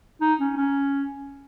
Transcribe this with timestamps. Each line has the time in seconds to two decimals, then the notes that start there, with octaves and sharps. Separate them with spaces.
0.21 D#4
0.39 C#4
0.57 C#4